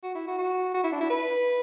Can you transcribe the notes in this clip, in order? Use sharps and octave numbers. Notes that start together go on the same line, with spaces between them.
F#4
E4
F#4
F#4
F#4
E4
D4
E4
B4